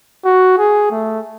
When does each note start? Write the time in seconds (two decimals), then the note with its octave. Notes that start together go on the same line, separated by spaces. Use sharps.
0.25 F#4
0.58 G#4
0.91 A3